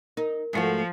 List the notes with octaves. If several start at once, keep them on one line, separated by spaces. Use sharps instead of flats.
D#4 A#4
G#2 F3 A3 F#4